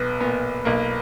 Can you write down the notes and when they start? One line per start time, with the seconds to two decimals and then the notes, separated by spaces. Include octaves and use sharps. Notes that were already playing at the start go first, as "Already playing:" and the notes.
Already playing: B1 B3
0.20 A#2 B3
0.65 B1 A#3